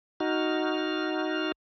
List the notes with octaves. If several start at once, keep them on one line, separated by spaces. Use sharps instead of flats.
D#4 F#4 F6